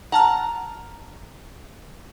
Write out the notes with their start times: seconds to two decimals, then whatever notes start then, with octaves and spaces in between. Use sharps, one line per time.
0.12 F#5 A5 A#5 F6